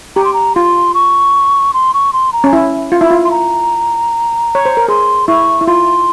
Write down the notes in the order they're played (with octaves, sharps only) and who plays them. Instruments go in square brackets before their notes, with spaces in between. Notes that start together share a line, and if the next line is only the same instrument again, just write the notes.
[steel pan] G4 [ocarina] A#5
[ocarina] C6
A#5
[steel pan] F4 [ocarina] C6
[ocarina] C#6
C6
C#6
C6
A#5
[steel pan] C#4
E4
F4
E4
F4
[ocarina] C6
A#5
[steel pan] C#5
C5
A#4
[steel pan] G#4 [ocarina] C6
[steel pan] E4 [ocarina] C#6
[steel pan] E4
[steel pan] F4 [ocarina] C6